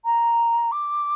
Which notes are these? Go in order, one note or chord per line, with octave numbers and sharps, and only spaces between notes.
A#5
D6